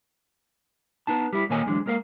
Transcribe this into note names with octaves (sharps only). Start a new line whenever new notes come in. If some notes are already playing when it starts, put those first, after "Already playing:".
B3 D#4 A5
G3 E4
A#2 D#3 A#3 C#5 D#5 G#5
D2 E3 F#3 G#3 D4
G#3 A#3 A#4 D#5 F5